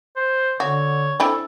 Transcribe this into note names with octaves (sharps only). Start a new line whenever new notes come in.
C5
D3 F#4 C#5
C4 D4 E4 A4